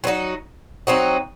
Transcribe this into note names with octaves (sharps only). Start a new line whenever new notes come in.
F#3 C4 D#4 F#4
F#3 C4 D#4 F#4